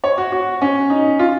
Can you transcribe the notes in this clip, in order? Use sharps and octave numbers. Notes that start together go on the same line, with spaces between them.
C#5
F#4
F#4
C#4
D#4
F4